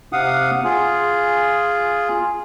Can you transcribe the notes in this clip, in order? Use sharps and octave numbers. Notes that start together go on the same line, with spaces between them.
C3 F5 F#5 D#6
F4 G#4